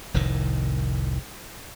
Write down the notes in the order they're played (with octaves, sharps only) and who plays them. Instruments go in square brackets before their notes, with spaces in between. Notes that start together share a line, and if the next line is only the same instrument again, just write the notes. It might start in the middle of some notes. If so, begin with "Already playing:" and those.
[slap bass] F1 C2 A2 D#3